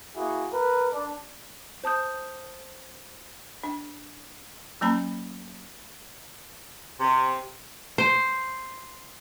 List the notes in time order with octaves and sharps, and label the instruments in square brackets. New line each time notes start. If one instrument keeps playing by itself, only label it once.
[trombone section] A#3 E4 F#4 G#4
A#4 B4
D4
[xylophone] C5 A5 D#6 G6
[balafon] D4
F#3 A#3 C#4 A5 B5
[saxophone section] C3
[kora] C5